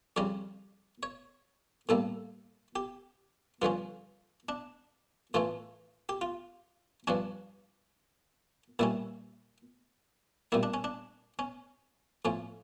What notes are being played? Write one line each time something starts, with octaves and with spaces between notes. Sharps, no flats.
F2 C#3 G3 C#4 D5
C#5
A2 G3 A#3 A4
G4
G2 D3 F3 C#4 F4
D4
A2 E3 A3 C#4 F4
G4
F4
G2 F3 C#4 D4
A#2 G3 C#4 E4
A#2 G3 A#3 E4
D4
C#4
D4
C#4
A2 F3 C#4